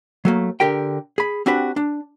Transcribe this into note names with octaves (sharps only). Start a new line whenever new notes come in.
F#3 A3 A#3
D3 G4 A#4 G5
G#4 B5
C4 D4 F#4 G4 B4
D4